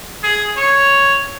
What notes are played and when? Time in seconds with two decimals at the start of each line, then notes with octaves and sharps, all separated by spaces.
0.23 G#4
0.57 C#5